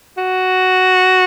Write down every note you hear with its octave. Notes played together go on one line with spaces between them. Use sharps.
F#4